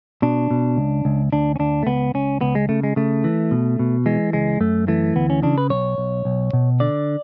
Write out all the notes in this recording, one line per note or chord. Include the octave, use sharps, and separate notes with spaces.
B2 D4
B2
C#2
C#2
D2 D4
C#4
D2 D4
A3
C#2 B3
C#2 C#4
C#2 B3
G#3
C#3 A3
G#3
C#3 A3
E3
B2
B2
E3 G#3
C#2 G#3
F#2 A3
E3 A3
D2 B3
C#4
C#3 D4
B4
B1 C#5
B1
B1
B2
D3 D5